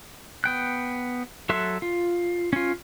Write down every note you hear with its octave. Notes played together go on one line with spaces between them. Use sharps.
B3 G5 F#6
F#3 A4 E5 C6 F#6
F4
C#4 F4